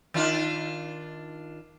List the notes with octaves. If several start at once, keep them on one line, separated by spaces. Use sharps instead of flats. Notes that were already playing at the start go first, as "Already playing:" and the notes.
D#3 D4 F4